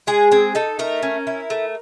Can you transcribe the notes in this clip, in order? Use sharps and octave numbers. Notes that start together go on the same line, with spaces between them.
G#3 G#4
C4 G#4
D#4 A4
A3 A#4
C#4
E4
A3